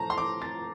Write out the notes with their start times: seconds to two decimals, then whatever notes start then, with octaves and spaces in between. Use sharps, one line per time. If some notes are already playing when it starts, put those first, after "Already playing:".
Already playing: A2 F3 A5 A#5
0.10 C6
0.18 D6
0.42 A6